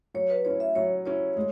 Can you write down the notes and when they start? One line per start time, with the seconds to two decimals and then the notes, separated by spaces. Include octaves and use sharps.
0.14 F#3 C#5
0.30 B4
0.45 C#4 E4 C#5
0.60 E5
0.75 F#3 C#5
1.06 C#4 E4 C#5
1.36 G#3